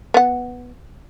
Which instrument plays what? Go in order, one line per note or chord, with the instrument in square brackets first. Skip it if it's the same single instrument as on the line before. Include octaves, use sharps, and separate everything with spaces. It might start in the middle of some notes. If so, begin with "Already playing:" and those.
[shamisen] B3 F#5